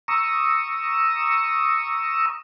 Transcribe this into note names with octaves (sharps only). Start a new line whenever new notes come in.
A#5 C#6 D#6 E6